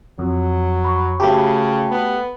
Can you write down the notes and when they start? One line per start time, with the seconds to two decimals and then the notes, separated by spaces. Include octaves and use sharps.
0.19 F2 F#3
0.84 B5 C#6
1.20 C#3 A3 F#4 G4 A5 B5
1.91 B3